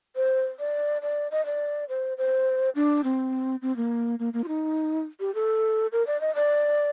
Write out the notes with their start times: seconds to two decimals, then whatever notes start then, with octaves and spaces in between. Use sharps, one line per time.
0.16 C5
0.59 D5
1.02 D5
1.31 D#5
1.46 D5
1.89 C5
2.18 C5
2.75 D4
3.04 C4
3.62 C4
3.76 A#3
4.19 A#3
4.33 A#3
4.44 F4
4.48 D#4
5.20 G4
5.35 A4
5.92 A#4
6.07 D5
6.21 D#5
6.35 D5